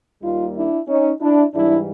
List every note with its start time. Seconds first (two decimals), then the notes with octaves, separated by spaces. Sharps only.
0.22 D#2 D#3 G3 A#3 D#4 F4
0.55 D4 E4
0.88 C#4 D#4
1.20 D4 E4
1.53 G#2 E3 G3 D4 E4